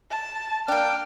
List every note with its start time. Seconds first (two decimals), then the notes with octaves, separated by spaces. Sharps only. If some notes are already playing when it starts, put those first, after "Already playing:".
0.11 A5
0.68 A#3 D4 G5 F6